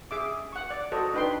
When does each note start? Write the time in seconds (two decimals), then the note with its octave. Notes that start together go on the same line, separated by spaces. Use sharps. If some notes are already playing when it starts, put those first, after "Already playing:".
0.11 G#4 E5 D6
0.52 F#5 C#6
0.70 D5
0.92 F#4 A4 C5 D#5
1.14 D4 D#4 B4 G5 C6